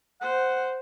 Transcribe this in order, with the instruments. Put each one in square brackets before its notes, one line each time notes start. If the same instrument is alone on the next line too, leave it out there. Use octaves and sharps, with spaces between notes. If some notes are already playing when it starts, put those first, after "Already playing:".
[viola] C5 [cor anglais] F#5